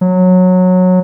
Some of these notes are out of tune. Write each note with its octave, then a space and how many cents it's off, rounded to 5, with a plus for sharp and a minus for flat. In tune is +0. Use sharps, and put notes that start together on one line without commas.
F#3 -15